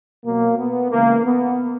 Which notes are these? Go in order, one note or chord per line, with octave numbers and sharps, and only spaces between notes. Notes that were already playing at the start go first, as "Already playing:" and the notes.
B2 F#3 A#3
B3
C#3 E3 G#3 A#3
B3